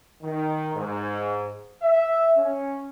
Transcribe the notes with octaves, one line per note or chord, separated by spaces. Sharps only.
D#3
G#2
E5
C#4